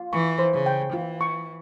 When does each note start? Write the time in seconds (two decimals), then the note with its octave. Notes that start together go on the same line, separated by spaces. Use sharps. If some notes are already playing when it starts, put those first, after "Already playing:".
Already playing: F4
0.13 E3 C#6
0.39 C5
0.53 C#3
0.66 G5
0.93 E3 F4
1.21 C#6